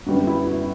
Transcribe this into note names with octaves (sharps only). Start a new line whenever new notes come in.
F#2 D3 G3 B3 F#4
E4
F#4